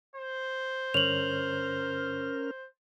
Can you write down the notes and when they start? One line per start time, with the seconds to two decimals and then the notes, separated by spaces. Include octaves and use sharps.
0.16 C5
0.94 G2 D3 C#4 A#4 C#5 F6 F7 F#7